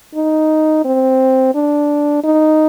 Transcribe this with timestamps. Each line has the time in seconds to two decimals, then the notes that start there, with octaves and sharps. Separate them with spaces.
0.15 D#4
0.85 C4
1.55 D4
2.24 D#4